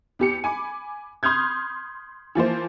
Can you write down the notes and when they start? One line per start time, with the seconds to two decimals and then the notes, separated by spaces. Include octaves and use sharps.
0.19 E2 G4 C#7
0.44 G#5 B5 D6
1.23 B5 C6 D#6 F6 G6 G#6
2.35 E3 F3 A#3 C5